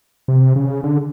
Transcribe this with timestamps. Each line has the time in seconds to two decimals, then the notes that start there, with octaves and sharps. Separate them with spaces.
0.28 C3
0.56 C#3
0.84 D3